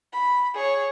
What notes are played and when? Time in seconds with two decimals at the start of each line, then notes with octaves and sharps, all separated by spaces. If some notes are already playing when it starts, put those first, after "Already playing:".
0.13 B5
0.55 G#4 C#5